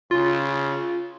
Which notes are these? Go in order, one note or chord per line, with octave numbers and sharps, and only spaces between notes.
C#3 F4